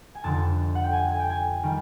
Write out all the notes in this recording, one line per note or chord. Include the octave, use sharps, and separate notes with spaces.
G#5
F1 F2 D3 A5
F#5
G5
G#5
G#5
G5
G#5
D#3 G3